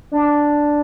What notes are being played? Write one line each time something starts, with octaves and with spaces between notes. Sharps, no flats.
D4